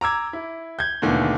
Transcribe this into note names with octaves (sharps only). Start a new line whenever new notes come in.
A#5 D6 E6 G#6
E4
G6 G#6
D#2 B2 D3 E3 A3